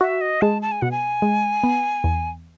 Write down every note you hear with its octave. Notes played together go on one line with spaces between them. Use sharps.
F#4 E5
D#5
G#3 A5
A5
G#5
B2 F#5
G#5
G#3
B3
E2